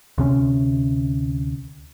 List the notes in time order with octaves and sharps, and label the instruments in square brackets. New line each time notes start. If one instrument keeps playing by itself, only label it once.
[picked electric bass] D2 C3 C#4